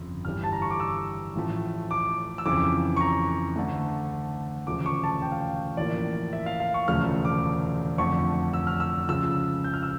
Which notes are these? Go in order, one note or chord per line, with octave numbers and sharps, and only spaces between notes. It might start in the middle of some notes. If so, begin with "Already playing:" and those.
Already playing: G1 F2 C#3
G1 G2 E3 G3 F6
A5
A#5
C#6
D6
E6
A1 A2 F3 A3
D6
E6
F2 C#3 E3 D6
C#6
A#5
D2 D3 A3
E1 D2 C#3 F3 A3 D6
D6
C#6
A5
G5
F5
G5
A1 A2 F3 A#3 D5
E5
F5
F5
C#6
E1 D2 C#3 F3 A3 F6
D6
F2 D3 A3 C#6
E6
F6
E6
C#2 C#3 F3 E6
G6
F6
E6